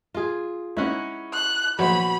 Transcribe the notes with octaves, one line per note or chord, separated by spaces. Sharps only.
F4 G#4
G#3 C#4 D#4 E4 F#5
F#6
A#1 F#3 B3 C5 B5